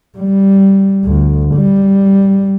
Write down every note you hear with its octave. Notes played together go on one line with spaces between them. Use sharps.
G3
D2
G3